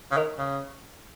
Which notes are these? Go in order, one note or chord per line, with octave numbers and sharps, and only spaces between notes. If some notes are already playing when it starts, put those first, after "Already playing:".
C#3
D#3
C#3